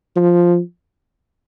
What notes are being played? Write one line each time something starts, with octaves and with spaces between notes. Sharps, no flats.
F3